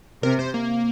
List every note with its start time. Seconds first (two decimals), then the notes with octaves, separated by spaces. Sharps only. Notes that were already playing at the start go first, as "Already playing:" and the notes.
0.23 C3 A#4
0.39 C5
0.54 A#3